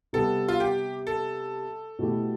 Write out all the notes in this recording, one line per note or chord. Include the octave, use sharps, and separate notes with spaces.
C3 G3 B3 A4
F4
G4
A4
B2 A3 E4 G4